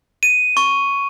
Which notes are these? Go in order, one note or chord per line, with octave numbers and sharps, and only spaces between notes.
D#7
C#6